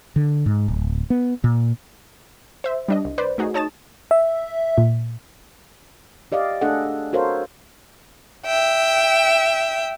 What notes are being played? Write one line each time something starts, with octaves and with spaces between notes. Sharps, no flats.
D3
G#2
D1
B3
A#2
C5 E5
G3 D4 D#5
C2
B4 C5 D5
A3 D#4 F#4 G#4
D#4 C#5 A5 D#6 A6 E7
E5
A#2
G4 D5 D#5 F5
A3 D4 G#4 A4 D#5 F#5
F#4 A4 A#4 C5 C#5 F5
E5 G5